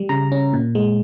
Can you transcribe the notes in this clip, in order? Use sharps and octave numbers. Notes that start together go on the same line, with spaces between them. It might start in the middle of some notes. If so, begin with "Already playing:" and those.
Already playing: G3
C#3 A#5
C#4
A#2
G#3